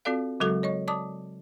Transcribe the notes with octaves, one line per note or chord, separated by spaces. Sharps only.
C4 F4 F#4 A4 D5 F5
C#3 F#3 G#3 F#4 A4
C#5 D#5 C#6
D5 A5 D6 D#6